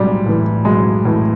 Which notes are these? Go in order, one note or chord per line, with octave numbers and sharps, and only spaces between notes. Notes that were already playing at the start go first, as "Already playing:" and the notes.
Already playing: B1 A2 G3 G#3
A2 E3
B1 G#3
A2 E3